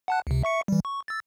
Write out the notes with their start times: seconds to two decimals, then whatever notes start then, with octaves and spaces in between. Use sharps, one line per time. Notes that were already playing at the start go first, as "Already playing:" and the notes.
0.08 F#5 A5 F#6
0.27 C#2 C3
0.43 E5 C#6 C#7
0.68 E3 G3
0.85 C#6
1.08 E6 A6